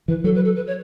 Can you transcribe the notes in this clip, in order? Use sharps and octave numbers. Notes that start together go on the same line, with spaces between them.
E3 B4
F#3 A4
B4
A4
B4
C#5